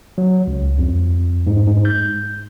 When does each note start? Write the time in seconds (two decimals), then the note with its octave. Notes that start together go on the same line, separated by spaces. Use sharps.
0.18 F#3
0.47 C#2
0.78 F2
1.47 G#2
1.67 G#2
1.85 G6